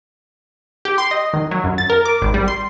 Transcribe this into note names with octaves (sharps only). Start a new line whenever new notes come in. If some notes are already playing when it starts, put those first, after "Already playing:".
G4
C6
D#5
D#3
F#3
F#2
A6
A#4
D6
G#1
G3
C6